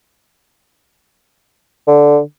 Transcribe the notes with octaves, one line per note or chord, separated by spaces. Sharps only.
D3